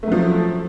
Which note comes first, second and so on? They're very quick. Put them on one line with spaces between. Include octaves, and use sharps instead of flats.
A3 F#3 F3